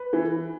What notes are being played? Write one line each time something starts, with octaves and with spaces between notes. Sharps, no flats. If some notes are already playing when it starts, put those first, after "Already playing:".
Already playing: B4
E3